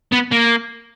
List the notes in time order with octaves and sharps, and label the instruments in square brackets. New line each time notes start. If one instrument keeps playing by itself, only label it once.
[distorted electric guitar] B3
A#3